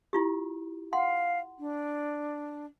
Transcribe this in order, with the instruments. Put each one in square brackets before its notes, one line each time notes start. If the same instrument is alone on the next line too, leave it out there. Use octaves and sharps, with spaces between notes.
[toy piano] E4 F4 G4
[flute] F5 [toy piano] F#5 C6
[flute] D4